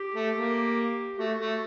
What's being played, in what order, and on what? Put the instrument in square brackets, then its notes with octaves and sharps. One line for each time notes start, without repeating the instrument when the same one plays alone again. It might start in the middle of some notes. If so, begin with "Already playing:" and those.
Already playing: [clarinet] G4
[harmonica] A3
A#3
[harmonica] A3 [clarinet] F#4
[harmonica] A3